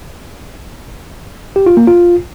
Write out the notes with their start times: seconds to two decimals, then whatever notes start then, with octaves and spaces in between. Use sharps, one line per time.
1.56 G4
1.66 F4
1.77 A#3
1.87 F4